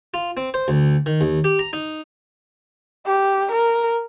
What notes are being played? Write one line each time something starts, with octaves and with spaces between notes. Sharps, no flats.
F4
C4
C5
D2
D#3
D#2
G4
A#5
D#4
G4
A#4